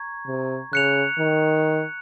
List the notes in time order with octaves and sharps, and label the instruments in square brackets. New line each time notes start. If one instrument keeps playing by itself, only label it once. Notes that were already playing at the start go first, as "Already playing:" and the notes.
Already playing: [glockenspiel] A#5 C#6 G#6
[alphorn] C3
[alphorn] C#3 [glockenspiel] F#6 C#7 F7
[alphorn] D#3